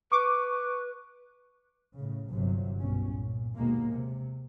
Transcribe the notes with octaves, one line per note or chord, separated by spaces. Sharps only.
B4 C#6 D6
A2 C#3
G1 C3 F#3
G1 C2 B2 C#4
A#2
D#2 B2 G#3 A#3
C3